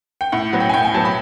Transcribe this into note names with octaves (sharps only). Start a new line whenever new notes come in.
G5
A2 F#5
F#3 B3
G5
G#5
A2 G5
G#5
F#3 B3 A5
B5